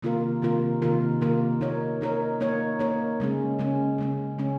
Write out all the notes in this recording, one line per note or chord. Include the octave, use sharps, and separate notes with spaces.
C3 D#3 A#3 F4 A#4
C3 D#3 A#3 F4 A#4
C3 D#3 A#3 F4 A#4
C3 D#3 A#3 F4 A#4
A#3 D#4 A#4 C#5
A#3 D#4 A#4 C#5
A#3 D#4 A#4 C#5
A#3 D#4 A#4 C#5
C#3 G#3 C#4
C#3 G#3 C#4
C#3 G#3 C#4
C#3 G#3 C#4